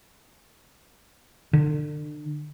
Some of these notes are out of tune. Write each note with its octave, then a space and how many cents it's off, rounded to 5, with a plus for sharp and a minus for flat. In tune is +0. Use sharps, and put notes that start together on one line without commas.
D3 +35